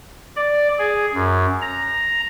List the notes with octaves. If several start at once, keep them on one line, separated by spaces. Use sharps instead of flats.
D5
G#4
F#2
A#5